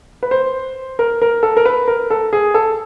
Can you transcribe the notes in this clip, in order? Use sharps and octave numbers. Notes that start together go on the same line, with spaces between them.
B4
C5
A#4
A#4
A4
A#4
B4
A#4
A4
G#4
A4